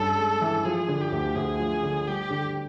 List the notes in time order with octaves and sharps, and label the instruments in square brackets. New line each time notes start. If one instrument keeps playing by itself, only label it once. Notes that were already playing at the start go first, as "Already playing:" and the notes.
Already playing: [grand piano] G2 C#4 [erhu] A4
[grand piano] G#3
E3
[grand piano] F3 [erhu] G#4
[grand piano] D3
[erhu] G4
[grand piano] D2
[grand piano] D2 [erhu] G#4
[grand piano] F3
D3
[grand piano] G3 [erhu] G4
[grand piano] D3